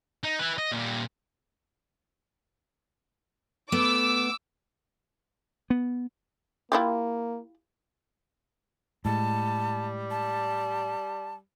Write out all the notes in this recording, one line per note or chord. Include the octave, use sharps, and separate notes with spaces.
D#4
E4 B4
D#5
A#2 G3
A3 B3 D6 E6
B3
A#3 E4 F4 G4
A2 G3 G#3 A5
A5